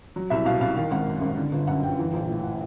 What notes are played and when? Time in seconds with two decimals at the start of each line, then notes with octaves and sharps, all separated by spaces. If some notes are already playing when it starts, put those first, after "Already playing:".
0.16 F#3
0.30 C2 E5
0.45 B2 F5
0.61 C2 F5
0.76 D#3 F5
0.91 G#1 F#5
1.07 F#2
1.21 G#1
1.37 D3
1.52 G1
1.67 F#2 F#5
1.83 G1 G5
1.99 E3
2.14 A#1
2.29 A2
2.43 F#5